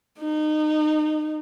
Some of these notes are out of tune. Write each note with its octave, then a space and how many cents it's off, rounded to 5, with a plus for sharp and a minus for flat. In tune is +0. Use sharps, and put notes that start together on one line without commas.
D#4 -25